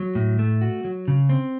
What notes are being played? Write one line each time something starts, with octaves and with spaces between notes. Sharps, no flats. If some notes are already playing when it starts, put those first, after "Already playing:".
Already playing: F#3
A2
A3
F#4
F#3
C#3
C4